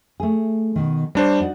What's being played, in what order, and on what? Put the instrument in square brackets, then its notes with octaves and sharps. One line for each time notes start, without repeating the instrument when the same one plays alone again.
[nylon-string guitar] A3 G#4
B2 D#3
[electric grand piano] G3 D4 C5 [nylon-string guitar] C#5
[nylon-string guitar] D#4 F#4 D5